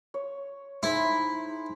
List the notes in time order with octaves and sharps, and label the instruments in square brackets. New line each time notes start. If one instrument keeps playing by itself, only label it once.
[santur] C#5
[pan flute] D#4 [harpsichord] E4 [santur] G#4 C5 D6